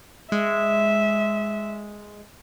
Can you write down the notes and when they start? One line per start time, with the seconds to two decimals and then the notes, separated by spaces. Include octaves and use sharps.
0.32 G#3 E5